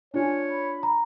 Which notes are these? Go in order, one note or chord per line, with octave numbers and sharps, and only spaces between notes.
D4 F4 C#5 G#5
B5
A#5